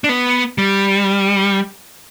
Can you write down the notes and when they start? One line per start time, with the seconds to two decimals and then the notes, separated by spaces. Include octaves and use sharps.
0.04 D4
0.09 B3
0.58 G3